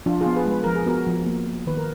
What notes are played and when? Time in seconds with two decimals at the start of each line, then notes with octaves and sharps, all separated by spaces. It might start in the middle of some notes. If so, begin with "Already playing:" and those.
0.06 F3 D4 F4
0.21 F4 G#4
0.26 B3
0.36 G#4 B4
0.46 G#3
0.51 B4
0.64 F3 A#4
0.75 G#4
0.86 B3 F#4 A#4
1.07 F3
1.26 A#3
1.47 A#3
1.67 D#3 B4
1.77 A#4